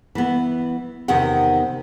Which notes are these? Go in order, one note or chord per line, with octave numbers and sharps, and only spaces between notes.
E3 B3
E2 C3 D#3 C4 F#5